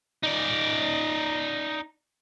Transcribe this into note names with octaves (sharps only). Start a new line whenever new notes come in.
D#4 D5